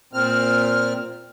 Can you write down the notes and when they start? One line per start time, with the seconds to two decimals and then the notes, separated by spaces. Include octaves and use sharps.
0.13 A#2 C4 F6